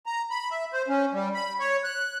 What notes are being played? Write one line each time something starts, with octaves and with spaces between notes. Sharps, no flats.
A#5
B5
E5
C5
C#4
G3
B5
C#5
F#6